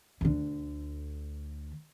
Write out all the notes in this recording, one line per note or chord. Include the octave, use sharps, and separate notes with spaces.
D2 D3